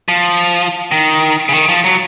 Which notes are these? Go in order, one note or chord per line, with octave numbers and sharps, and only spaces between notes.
F3
D#3
C#3
D#3
F3
F#3